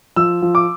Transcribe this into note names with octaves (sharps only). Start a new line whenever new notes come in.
F3 E6
F3
D6